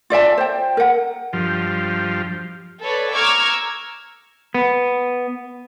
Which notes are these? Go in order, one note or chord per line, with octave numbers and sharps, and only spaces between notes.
F4 D5 E5 A5
C5 G5
A#4 F#5
G2 F3
A4 B4 C#5 D5
A#5 C#6 D6 E6 F6 G#6
B3